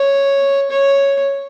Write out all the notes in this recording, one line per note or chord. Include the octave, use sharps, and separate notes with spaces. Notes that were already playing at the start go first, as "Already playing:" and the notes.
Already playing: C#5
C#5